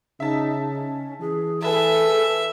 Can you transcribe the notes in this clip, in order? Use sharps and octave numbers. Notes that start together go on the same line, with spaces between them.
C#3 D#4 E5 A5
C#4
E3 G#4
G#4 A4 B4 E5 A5